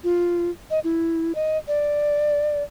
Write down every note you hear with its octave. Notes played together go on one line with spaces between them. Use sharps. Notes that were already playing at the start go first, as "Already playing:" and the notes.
F4
D#5
E4
D#5
D5